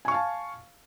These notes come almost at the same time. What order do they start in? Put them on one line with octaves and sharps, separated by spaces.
G#5 C#6 F5 A5